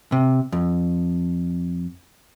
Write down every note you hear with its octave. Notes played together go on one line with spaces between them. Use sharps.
C3
F2